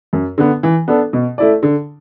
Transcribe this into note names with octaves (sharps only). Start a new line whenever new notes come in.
F#2
D3 B3
E3
B3 D4 A4
B2
A3 E4 D5
D3